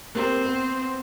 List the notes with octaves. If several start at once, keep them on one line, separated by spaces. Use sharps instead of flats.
A#3 C4 G4 A#4
B3